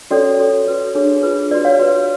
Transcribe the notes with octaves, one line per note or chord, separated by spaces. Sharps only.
C#4 F#4 A4 C#5 D5
F#4 A4 C#5
F#4 B4
D4 G#4 C#5
F4 G#4 B4
F#4 B4 D5
C#5 F5
F#4 B4